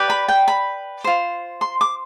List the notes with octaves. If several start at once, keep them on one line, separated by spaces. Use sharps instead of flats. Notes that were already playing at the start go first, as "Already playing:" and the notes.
Already playing: G4 B4 D5
B5
G5
B5
F4 C5
C6
D6